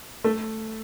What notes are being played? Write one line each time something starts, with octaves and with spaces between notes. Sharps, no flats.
A3